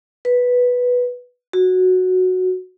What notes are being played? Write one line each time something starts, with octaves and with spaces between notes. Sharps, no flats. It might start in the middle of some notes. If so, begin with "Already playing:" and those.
B4
F#4